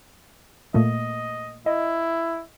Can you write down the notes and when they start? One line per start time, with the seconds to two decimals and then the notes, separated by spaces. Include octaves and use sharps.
0.74 A#2 A3 A#3 D#5
1.66 E4 D#5